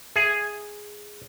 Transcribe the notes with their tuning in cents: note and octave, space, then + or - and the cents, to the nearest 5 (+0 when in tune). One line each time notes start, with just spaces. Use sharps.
G#4 +0 E5 +10